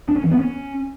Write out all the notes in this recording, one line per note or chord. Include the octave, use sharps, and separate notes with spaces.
D4
C#4
E3
B3
C#4